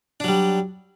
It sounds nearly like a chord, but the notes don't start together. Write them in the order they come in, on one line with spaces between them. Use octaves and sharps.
D4 F#3 G3